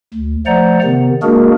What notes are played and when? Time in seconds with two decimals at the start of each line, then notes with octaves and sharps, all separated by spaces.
0.14 D2
0.46 F3 A3 C5 D5 F#5 A#5
0.83 C3 D#3 B3
1.22 G#3 A#3 D4 F#4 G#4 A#4